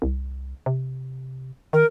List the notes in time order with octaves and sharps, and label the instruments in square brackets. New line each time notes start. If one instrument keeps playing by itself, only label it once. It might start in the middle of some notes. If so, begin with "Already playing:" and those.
[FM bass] C2
C3
[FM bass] D#3 [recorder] A#4